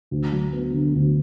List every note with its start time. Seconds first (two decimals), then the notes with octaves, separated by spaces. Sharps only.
0.11 D2
0.32 F#3
0.53 B3
0.73 D3
0.95 D2